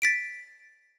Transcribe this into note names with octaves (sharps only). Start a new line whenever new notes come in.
A6 B6 D7